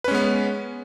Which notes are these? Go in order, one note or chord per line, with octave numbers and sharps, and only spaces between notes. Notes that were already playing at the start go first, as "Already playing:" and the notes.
G#3 B3 C#4 B4